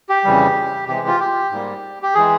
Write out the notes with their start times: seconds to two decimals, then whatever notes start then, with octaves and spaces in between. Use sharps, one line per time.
0.09 G4
0.24 F2 C#3 E3 G3
0.88 C3 E3 G#3 G4
1.07 F4
1.20 G4
1.51 G#2 G3 A#3
2.03 G4
2.15 E3 G#3 G#4